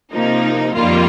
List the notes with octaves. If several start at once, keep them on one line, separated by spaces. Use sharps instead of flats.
C3 F3 A#3 D#4
F2 D#3 G3 A#3 F4